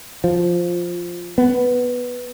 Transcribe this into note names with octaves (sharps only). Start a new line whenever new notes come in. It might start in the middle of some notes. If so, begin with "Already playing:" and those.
F3
B3